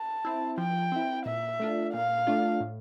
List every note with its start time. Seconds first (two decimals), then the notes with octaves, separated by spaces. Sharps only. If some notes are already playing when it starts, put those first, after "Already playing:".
Already playing: A5
0.25 C4 E4
0.58 F3 G5
0.92 C4 E4
1.26 A#2 E5
1.60 A3 D4 F4
1.93 A#2 F5
2.27 A3 D4 F4
2.60 A2